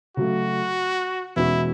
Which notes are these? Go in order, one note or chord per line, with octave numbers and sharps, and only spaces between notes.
C#3 F#3 A3 F#4
E2 B2 G#3 C#4 E4 F#4